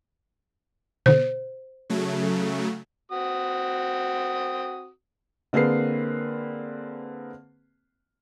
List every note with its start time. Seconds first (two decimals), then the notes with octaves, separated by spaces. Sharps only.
1.06 B2 D3 C5
1.90 C#3 F#3 A3
3.12 C4 F#4 D#6
5.53 D3 A#3 C4 G#4 B4 C7